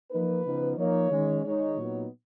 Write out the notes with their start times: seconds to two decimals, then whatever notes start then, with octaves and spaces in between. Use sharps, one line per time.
0.12 F3 A#3 D#4 B4
0.45 C#3 F3 B3 D#4
0.78 F3 A#3 D#4 C#5
1.11 D#3 G#3 C#4
1.44 D#3 G#3 D#4 C#5
1.77 A#2 F#3 B3 D#4